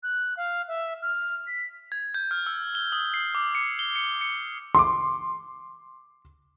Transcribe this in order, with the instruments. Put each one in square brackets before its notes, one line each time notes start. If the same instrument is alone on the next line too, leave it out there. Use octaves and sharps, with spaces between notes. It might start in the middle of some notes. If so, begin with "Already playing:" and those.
[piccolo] F#6
F5
E5
F6
B6
[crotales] G#6
G6
F6
E6
G7
D#6
C7
D6
C#7
G7
C#7
C#7
[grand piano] C6 D6